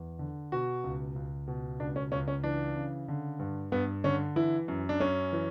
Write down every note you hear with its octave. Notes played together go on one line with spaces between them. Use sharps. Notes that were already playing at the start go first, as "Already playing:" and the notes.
Already playing: E2
D3
B2 F#4
C#2
C#2
B2
C#2 D4
C#4
C#2 C#4
C#4
E3 D4
C#3
D3
G2
G2 B3
D3 C#4
E3 E4
F#2
D4
F#2 C#4
E3